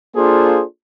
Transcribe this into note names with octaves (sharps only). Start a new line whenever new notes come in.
A#3 D4 F4 G#4 A4 C5